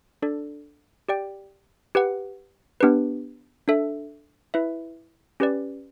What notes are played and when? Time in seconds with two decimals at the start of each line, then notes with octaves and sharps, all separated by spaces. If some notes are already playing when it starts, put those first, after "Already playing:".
0.22 D4 A4 D5
1.09 G4 D5 G5
1.95 G4 B4 F#5
2.81 B3 D4 G4 B4
3.68 D4 A4 E5
4.54 E4 B4 E5
5.40 C#4 G4 B4 D5